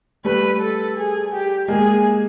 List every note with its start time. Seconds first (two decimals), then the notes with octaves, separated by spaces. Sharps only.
0.25 G3 A3 B4
0.60 A4
0.97 G#4
1.33 G4
1.68 G#3 A#3 G#4